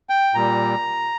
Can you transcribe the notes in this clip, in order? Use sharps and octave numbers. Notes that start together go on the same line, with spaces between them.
G5
A#2 G3 A#5